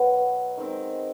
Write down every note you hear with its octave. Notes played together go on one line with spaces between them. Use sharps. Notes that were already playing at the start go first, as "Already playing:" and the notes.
Already playing: B2 F#3 B3
D#3 G#3 C4